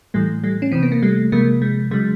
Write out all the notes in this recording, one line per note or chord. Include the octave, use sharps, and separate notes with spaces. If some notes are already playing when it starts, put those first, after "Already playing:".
A2 E3 G3 A3
G3 A3
C#4
C3 E3 C4
B3
A#3
G3 A3
C3 F3 G#3 A#3
G#3
C#3 F#3 G#3